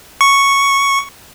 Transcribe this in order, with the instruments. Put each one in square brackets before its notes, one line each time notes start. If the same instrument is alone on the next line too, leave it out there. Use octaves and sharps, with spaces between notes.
[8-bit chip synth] C#6